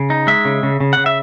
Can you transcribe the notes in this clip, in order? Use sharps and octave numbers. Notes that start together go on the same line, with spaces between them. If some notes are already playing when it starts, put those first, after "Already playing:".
Already playing: C#3
D#4
G#3 E5
C#3
C#3
C#3
C#3 F#5
E5